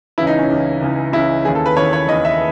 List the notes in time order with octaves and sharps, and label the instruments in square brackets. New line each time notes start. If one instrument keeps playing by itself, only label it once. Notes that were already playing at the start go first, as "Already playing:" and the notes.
[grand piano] C#2 C#3 E3 E4
D#4
C#4
C#2 C#3 E3
C#2 C#3 E3
C#2 C#3 E3 E4
D#2 C#3 E3 G#4
A4
B4
D#2 C#3 E3 C#5
C#5
D#2 C#3 E3 D#5
E5